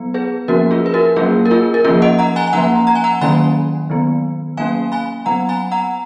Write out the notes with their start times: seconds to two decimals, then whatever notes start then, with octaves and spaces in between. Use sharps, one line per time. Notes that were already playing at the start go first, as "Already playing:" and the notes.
Already playing: F#3 B3
0.14 G#4 B4
0.48 F3 A#3 C#4 F#4 A#4
0.71 F4 G#4
0.86 B4
0.94 F#4 A#4
1.16 F#3 A#3 C#4 F4 G#4
1.46 A#4
1.51 F4 G#4
1.74 A#4
1.84 F3 A#3 C#4 F4 G#4
2.02 D#5 F#5
2.19 F#5 A#5
2.36 G#5 B5
2.47 G#5
2.53 F3 A#3 C#4 F#5 A#5
2.87 A#5
2.95 G#5
3.04 F#5 A#5
3.21 D#3 F#3 A#3 C#4 G#5 B5
3.90 D#3 F#3 B3
4.57 F#3 A#3 C#4 F5 G#5
4.92 G#5 B5
5.26 F#3 B3 F#5 A#5
5.49 G#5 B5
5.72 F#5 A#5